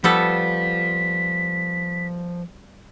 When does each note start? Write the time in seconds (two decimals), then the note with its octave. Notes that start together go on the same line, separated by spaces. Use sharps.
0.04 F3 G3 B3 A4 B6